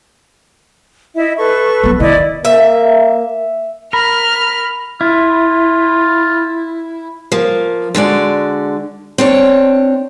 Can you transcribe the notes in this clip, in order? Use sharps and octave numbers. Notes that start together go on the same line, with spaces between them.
E4 D#5 E5
A4 B4 C#6
F#3 B3
D#3 E4 D5 D#5
A#3 E5
A#4 B5 F6
E4 F4
F3 A#3
D3 G#3 F#4 D5
C4 D4 C#5